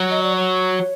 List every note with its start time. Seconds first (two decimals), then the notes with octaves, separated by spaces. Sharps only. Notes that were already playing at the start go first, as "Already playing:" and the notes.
Already playing: F#3
0.11 D#5
0.23 D5
0.36 C#5